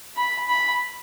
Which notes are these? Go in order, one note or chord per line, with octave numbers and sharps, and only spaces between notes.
B5
B5